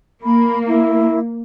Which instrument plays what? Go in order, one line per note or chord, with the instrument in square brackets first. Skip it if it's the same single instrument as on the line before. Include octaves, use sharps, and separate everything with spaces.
[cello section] A#3 [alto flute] B5
[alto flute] E4